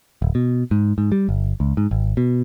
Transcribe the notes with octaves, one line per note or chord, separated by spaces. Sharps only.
D1
B2
G#2
G#2
G3
G1
C#2
G#2
G#1
B2